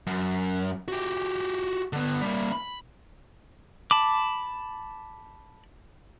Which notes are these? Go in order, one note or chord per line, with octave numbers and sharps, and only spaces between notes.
F#2
F#4 G4
D3 B3
G3 A#3
B5
A5 B5 D6